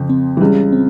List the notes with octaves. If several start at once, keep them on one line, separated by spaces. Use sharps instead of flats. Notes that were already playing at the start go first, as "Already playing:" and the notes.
Already playing: F2 C#3 F3
C4
E3
C#2 C#3 G3
C4